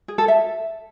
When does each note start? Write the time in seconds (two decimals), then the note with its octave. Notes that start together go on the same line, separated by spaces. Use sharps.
0.08 G#4
0.18 A4
0.28 E5